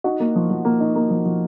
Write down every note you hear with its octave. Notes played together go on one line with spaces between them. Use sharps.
D#4 F#4
A#3
F3
F3
A#3
D#4
A#3
F3
F3